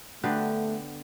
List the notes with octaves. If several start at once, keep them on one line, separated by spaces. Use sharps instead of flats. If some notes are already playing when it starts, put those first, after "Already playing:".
D3 A3 B3 G4